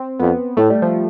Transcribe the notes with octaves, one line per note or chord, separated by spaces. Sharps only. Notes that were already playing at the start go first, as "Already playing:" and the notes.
Already playing: C4
F2 B3
A2 A3
G3
F3